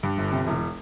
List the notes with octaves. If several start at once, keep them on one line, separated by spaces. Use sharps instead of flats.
G2
G1
C3
E1